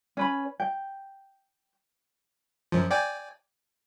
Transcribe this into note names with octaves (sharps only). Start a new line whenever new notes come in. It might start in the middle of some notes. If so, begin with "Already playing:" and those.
C#4 B4 B5
G5
F#2 F3
D5 G5 G#5